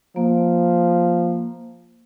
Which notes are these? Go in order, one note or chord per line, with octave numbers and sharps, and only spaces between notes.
F3 A#3